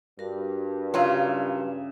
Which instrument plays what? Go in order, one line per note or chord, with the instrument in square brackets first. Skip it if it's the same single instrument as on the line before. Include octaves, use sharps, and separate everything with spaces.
[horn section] G2 [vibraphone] F#4 A#4
[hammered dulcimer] C#3 E5 [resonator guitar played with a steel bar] F#3 F4